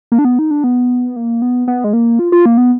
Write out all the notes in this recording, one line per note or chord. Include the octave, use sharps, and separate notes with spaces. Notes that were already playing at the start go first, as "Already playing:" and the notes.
A#3
D4
B3
D#4
D4
B3
A#3
B3
B3
G#3
A#3
F4
F4
A#3
B3